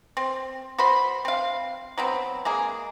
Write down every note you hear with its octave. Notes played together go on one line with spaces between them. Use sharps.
C4
F#4 C5 B5 C6
C4 F5
F#3 B3 C4
G#3 A#3 G#4